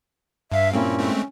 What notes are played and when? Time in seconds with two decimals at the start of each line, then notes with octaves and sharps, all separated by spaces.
0.52 G2 E5 F5
0.73 G2 A#2 C4 C#4 E4
0.98 G#3 A3 C4